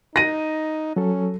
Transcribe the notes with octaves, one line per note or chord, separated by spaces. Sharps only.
D#4 A#6 D#7
F#3 C#4 A4